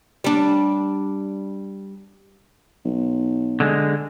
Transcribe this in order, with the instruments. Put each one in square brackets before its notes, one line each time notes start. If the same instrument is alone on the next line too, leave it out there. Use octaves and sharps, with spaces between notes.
[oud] G3 D4
[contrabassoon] B1
[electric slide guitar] D3 G#3